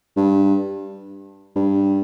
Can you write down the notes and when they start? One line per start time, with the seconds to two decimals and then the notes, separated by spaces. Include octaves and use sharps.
0.17 G2
1.56 G2